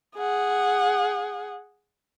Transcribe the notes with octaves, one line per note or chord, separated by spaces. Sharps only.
G#4 F#5